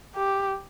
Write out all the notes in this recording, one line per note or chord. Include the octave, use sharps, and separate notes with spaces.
G4